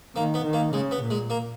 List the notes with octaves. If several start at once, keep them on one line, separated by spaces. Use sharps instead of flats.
D#3 A#3
B3
D#3
A#3
C#3 G#3
B3
A#2
G#3
A#3